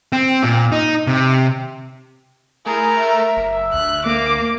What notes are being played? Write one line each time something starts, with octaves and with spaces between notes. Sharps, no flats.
C4
A#2
D#4
C3
A3 E4 G#4 A#4
E5
F#1
D2 F#6
A#3 D6